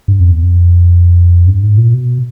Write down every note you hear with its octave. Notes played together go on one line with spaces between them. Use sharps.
G2
F2
E2
F2
G2
G#2
A#2
B2